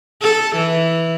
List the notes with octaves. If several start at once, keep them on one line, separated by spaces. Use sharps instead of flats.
A4
E3